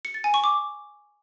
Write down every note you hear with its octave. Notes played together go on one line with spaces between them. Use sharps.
C#7
A6
G#5
C#6
D6